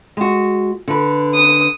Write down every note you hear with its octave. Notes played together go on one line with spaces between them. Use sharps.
G#3 F#4
D3 B4
D#6